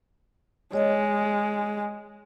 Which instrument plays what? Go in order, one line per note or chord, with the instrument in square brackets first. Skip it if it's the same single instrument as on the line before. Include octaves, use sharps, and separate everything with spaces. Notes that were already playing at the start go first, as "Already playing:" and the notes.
[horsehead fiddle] G#3 [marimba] C#5 D#5 G#5